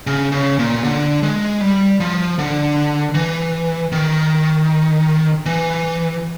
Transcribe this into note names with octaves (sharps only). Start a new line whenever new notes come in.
C#3
C#3
A#2
D3
G#3
G3
F3
D3
E3
D#3
E3